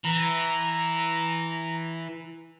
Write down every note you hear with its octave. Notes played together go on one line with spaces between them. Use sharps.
E3 A#5